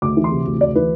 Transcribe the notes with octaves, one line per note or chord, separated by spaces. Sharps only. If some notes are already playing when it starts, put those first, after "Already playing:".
D2 D6
E3
C6
C3
D2
D2 D5
E3 B4